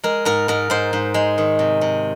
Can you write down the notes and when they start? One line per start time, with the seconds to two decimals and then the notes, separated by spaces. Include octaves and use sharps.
0.03 G#3 A#4
0.25 G#2 A#4
0.48 G#2 A#4
0.70 G#2 C5
0.93 G#2
1.14 G#3
1.38 D#3
1.59 C3
1.81 C3